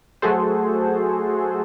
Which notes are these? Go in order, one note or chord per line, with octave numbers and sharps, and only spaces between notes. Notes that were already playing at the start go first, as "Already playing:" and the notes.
F#3 A3 F#4 G#4 A4 C5